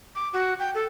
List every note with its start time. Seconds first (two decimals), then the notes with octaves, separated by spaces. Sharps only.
0.15 D6
0.33 F#4
0.59 G5
0.75 A4